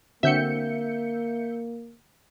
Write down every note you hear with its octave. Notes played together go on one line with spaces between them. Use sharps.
D3 A#3 C4 F#4 E5 G6 C#7